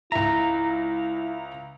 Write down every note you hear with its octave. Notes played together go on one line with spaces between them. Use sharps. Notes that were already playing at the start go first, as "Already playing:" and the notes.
C#2 E4 E5 A#5